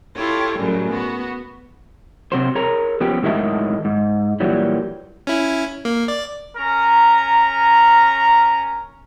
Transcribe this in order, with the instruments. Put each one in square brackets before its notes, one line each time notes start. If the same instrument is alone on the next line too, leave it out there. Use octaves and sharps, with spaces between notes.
[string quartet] E4 F4 G4 A4 C#5
F#2 A2 C#3 F#3 G3
B3 F#4
[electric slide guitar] C3 F#3 C5
G#4 A#4 C#5 A#5
F3 B3 C#4 G4
A2 D#3 F#3 G#3 E5 A5
G#2
A#2 E3 F#3 G3
[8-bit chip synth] C#4 E4
A#3
D5
[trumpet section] C#4 A#4 A#5